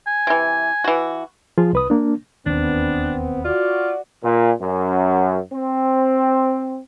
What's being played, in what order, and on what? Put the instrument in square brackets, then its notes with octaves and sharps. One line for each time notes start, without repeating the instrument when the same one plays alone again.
[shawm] G#5
[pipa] C3 E3
E3 F#4
[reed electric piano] F3 F4 G#4
C2 B4 D#6
A#3 D4
[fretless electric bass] E1 D#2 D#3 [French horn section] B3 C4 [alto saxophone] D4
[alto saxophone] F4 [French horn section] F#4 D5
[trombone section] A#2
F#2
C4